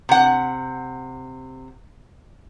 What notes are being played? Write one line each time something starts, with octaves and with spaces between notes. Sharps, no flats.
C3 F#5